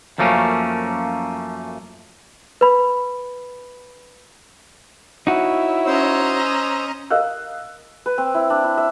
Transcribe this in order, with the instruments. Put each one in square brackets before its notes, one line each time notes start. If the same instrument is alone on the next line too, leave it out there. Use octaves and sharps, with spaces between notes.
[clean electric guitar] F#2 F3 A3 A#3 C#4
[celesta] B4 B5
[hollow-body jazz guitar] D#4 F#4 [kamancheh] E4 C#5
[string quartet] C#4 D#5 A#5 [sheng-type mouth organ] C5 E6
[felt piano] A#4 D#5 F5 E6 F#6
[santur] B4
C4
E4
D4
E4
E5